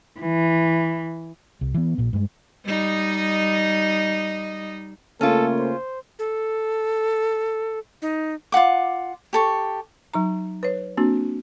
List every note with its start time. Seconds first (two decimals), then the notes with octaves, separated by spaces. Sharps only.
0.20 E3
1.61 C2
1.74 E3 B3
1.98 A#1 A#2
2.13 G2 G#3
2.66 G3 D#4 D#5
5.21 C#3 A3 A#3 C#4 F4 A4
5.59 C5
6.19 A4
8.02 D#4
8.52 F4 F#4 F#5 D6
9.33 G4 A4 C#6
10.14 F#3 D#4 A#5
10.63 B4 C#5
10.97 A#3 C4 D4 F#4